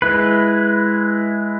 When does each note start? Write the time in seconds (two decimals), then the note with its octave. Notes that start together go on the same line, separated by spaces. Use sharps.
0.02 G#3 E4 B4